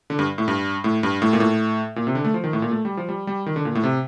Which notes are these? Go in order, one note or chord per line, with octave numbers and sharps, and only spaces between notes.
D3
G2
A2
G2
A2
G2
A2
A#2
A2
A#2
C3
D3
A3
F3
D#3
A2
A#2
A3
G3
F3
G3
G3
D#3
D3
A#2
A2
C3